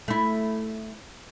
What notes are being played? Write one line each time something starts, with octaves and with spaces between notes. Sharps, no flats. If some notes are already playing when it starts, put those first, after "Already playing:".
A3 E4